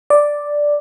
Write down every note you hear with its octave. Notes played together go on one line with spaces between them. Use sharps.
D5